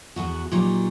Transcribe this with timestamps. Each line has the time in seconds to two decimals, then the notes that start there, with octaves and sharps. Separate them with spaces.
0.16 E2 B3 F#4
0.52 A#2 F#3 D#4 G4